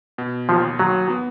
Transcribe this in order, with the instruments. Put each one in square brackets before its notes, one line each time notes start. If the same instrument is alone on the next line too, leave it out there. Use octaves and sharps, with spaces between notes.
[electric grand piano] B2
[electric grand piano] D#2 [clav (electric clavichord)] F3
[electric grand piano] D#2 [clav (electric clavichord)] F#3
[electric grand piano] B3